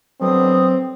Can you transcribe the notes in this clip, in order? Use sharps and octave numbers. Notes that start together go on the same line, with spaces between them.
B2 D3 F#3 C4 D#6